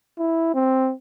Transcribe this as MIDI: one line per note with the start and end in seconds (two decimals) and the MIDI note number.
0.19 0.54 64
0.55 0.92 60